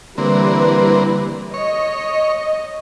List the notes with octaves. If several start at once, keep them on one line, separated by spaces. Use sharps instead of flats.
D3 E3 G3 A#3 C4 B4
C#5 D#5